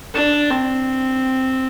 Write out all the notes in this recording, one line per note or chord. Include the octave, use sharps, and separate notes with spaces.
D4
C4